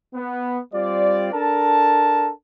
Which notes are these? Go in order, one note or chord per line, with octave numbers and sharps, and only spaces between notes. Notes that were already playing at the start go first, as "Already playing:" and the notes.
B3
G3 C4 F4 D5
D4 A4 A#4 A5